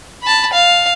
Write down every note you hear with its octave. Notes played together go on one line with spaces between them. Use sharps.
A5 B5
F5